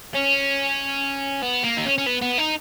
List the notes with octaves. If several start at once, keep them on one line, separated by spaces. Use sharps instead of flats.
C#4
B3
A#3
D#4
C#4
C#4
B3
B3
D#4